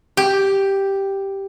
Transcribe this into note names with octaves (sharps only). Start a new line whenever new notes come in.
G4